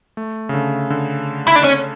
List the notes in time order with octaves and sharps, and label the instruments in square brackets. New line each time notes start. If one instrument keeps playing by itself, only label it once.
[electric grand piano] A3
C#3
D3
D3
[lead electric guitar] E4
D4
C#4